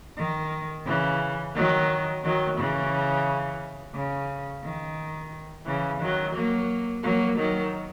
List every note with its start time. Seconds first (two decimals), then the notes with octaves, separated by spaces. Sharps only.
0.18 D#3
0.86 C#3 E3
1.55 D#3 F#3
2.23 D#3 F#3
2.57 C#3 E3
3.94 C#3
4.63 D#3
5.66 C#3 E3
6.01 D#3 F#3
6.34 F#3 A#3
7.04 F#3 A#3
7.37 D#3 F#3